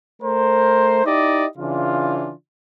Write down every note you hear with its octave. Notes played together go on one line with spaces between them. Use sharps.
A3 A#4 C5
D#4 E4 G4 D5 D#5
C#3 E3 D4 F4